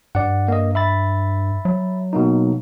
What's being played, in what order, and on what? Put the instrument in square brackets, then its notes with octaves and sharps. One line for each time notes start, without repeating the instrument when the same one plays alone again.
[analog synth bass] G2 [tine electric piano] D5 F#5
[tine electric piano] A#3 D#5
E5 B5 A6
[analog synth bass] F#3
[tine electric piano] B2 A#3 D#4